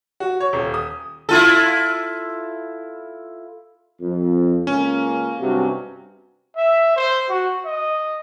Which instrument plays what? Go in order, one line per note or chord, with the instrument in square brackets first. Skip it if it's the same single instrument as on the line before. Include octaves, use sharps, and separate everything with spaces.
[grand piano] F#4
C#5
D#1
D#6
[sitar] E4 F4 A4
[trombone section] F2
[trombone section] C#2 A#3 [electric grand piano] C#4
[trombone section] G2 C3 F#3
[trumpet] E5
C5
F#4
D#5